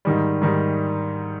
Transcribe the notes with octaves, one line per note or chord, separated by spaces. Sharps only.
G#2 D#3 G3
G#2 D#3 G3